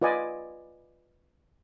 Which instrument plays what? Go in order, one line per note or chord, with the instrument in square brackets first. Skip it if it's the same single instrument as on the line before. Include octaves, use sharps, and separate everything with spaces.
[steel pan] F4 B4 D5 D#5 G#5